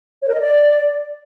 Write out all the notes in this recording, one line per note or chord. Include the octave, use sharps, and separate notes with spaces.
C#5
A#4
D#5
D5